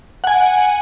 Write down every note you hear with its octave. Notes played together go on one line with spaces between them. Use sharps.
F#5 G#5